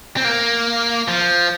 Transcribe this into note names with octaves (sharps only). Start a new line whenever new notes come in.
C4
A#3
F3